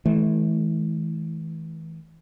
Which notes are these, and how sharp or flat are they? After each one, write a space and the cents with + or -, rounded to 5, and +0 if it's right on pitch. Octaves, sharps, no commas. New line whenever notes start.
E3 -30 A3 -45